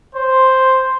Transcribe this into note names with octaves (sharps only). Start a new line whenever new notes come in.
C5